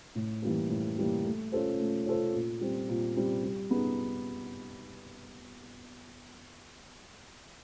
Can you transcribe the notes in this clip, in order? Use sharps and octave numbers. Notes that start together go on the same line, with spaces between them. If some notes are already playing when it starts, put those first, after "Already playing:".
A2
E3 G3 A#3
A2
E3 G3 A#3
A3
C#4 F4 A4 C5
A3
C#4 F4 A4 C5
A#2
G3 C4
A#2
G3 C4
G3
B3 D#4 G#4